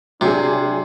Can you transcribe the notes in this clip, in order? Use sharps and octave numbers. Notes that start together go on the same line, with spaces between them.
C3 F#3 D4 G#4